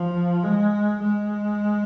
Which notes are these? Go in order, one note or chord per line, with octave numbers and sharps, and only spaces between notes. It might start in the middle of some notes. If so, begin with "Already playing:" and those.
Already playing: F3
G#3
G#3